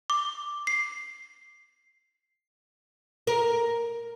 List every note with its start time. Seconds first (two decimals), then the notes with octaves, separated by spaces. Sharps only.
0.10 D6
0.67 C7
3.27 A#4